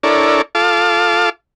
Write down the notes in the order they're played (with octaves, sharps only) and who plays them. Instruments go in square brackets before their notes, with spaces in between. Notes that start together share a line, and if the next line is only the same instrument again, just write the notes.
[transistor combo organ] D4 E4 A4 A#4 C#5 D5
F4 A4 F5 A5 D6